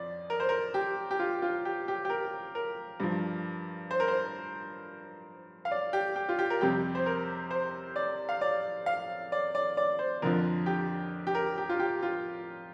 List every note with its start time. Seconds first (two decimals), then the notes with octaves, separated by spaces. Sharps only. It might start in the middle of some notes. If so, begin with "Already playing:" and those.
Already playing: F2 F3 D5
0.30 A#4
0.40 C5
0.49 A#4
0.74 G4
1.11 G4
1.19 F4
1.42 F4
1.65 G4
1.88 G4
2.05 G4
2.10 A#4
2.55 A#4
3.00 G2 F3
3.91 C5
4.00 A#4
4.08 C5
5.65 F5
5.71 D5
5.93 G4
6.16 G4
6.29 F4
6.39 G4
6.50 A#4
6.61 F2 C3 G3 G4
6.95 C5
7.06 A#4
7.51 C5
7.96 D5
8.29 F5
8.41 D5
8.86 F5
9.32 D5
9.55 D5
9.77 D5
9.99 C5
10.22 F2 D3 F3 A#4
10.66 G4
11.27 G4
11.35 A#4
11.58 G4
11.69 F4
11.80 G4
12.02 F4